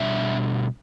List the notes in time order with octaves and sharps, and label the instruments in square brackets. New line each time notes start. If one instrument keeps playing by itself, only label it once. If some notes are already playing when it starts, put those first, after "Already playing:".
Already playing: [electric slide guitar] B2 G3 D4 E5